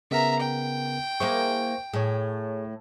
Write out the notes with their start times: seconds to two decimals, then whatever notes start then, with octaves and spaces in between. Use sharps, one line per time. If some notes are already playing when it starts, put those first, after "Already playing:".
0.11 C#3 B3 A#4 E5 A#5
0.40 G5
1.20 A#3 E4 G#4 C5 C#6
1.93 A2 G#4 C#5